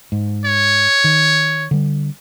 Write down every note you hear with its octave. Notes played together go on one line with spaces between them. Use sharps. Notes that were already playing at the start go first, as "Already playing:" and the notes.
G#2
C#5
D#3
D3 G3